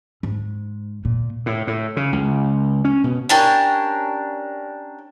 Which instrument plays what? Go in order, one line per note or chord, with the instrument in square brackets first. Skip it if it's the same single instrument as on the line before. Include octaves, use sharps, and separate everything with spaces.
[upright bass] G#2
A#2
[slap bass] A2
A2
C#3
C#2
C#4
B2
[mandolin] C#4 D4 G4 A#4